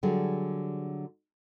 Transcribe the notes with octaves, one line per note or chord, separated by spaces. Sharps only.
D3 F#3 G3 G#4